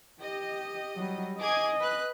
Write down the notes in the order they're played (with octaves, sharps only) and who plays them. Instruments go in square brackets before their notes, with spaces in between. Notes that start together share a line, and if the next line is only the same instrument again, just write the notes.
[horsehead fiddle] G4 [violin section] D#5
[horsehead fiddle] F#3 G3
[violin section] G#4 D6 G#6 [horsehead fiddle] D#5
[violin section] B4 F#6